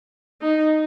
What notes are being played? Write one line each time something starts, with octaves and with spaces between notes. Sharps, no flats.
D#4